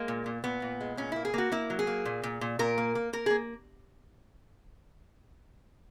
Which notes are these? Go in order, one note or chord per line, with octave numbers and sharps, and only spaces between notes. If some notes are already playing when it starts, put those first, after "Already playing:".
Already playing: G#3 A#3
A#2
A#2
A#2 B3
A#2
G#3
A#2 C#4
A#3 E4
G#4
A#3 F#4
A#3 E4
F#3
G#4
A#3
A#2
A#2
A#2
A#2 A#4
A#3
A#3
A#3 A#4
G#4
A#3